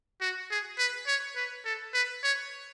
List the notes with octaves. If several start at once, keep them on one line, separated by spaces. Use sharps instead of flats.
F#4
G#4
B4
C#5
B4
A4
B4
C#5